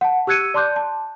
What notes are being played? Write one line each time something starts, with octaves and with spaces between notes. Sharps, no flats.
F#5 A5
G4 E6 F#6 G#6 C#7 D#7
D5 A5 C6 D6 F#6 G6
A5